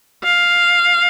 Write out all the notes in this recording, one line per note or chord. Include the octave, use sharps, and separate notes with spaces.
F5